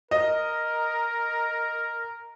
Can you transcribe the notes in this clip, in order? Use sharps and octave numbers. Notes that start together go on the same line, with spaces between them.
A#4 D#5